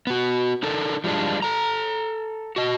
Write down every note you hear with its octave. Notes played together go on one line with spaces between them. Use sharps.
B3 F#4
D4 D#4 A4 A#4
F3 G3 G#3 D4 F4
A4 A#5
F#4 D#5